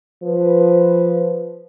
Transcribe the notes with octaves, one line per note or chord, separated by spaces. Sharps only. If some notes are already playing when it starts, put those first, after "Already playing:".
F3 B4